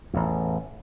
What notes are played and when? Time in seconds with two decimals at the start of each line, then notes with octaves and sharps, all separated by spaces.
0.14 A1 E2